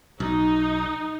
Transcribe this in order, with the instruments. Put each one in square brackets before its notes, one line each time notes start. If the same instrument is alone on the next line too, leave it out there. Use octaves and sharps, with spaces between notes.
[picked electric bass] B1 [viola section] D#4